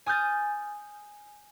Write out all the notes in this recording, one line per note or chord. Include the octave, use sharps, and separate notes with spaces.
G#5 D#6 F6 G6 A6